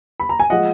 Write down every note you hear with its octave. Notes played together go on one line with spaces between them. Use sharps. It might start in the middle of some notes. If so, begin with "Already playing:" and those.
B5
A#5
G#5
F3 G#3 D#5 F#5